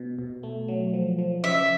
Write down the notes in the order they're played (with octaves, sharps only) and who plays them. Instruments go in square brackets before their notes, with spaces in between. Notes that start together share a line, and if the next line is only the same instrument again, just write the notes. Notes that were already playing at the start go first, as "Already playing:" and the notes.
Already playing: [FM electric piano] B2
B2
A3
F#3
F3
F3
[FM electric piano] C#3 [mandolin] E5